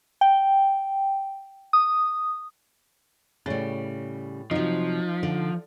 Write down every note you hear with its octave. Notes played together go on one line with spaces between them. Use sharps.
G5
D#6
A2 C#3 G3 C#5 A6
C3 F3 F#3 D#4
D3